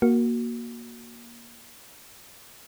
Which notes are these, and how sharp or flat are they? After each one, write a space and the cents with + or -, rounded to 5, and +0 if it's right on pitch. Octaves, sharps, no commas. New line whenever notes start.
A#3 +15 F#4 +0